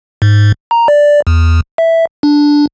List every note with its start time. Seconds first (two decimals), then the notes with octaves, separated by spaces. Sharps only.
0.22 G#2
0.71 A#5
0.88 D5
1.27 E2
1.78 E5
2.23 D4